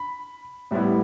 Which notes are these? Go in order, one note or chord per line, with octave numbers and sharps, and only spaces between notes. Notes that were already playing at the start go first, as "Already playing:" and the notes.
Already playing: B5
A2 G3 B3 E4